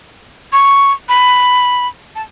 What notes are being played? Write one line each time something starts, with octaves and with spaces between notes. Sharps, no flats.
C#6
B5
A5